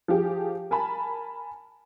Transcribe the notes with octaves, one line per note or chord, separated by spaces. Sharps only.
F3 G4 G#4
A#4 G#5 A5 B5